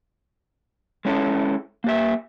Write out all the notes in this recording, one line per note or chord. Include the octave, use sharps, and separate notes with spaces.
G#3 C#4 E4 A4
A#3 G4 E5